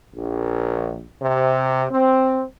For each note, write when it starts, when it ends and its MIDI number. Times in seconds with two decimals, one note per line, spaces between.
0.14 1.04 34
1.20 1.86 48
1.90 2.41 60